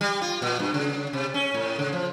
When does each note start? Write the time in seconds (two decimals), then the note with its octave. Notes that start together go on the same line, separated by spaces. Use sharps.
0.01 G3
0.21 F4
0.42 A#2
0.59 G2
0.74 C#3
1.13 C3
1.34 C#4
1.54 A2
1.79 C#3
1.93 F3